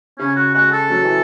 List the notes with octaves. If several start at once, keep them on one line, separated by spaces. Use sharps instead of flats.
C#3 C#4
F#4
G#3 F#4
A4
F#3
E3